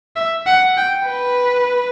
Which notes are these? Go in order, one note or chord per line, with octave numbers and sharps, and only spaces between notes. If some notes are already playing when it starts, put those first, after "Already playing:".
E5
F#5
G5
B4